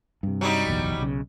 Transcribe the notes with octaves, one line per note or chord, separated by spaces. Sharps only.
G2 C3
F#3 G3 D#4
F#1 B1 E2
B1 C#3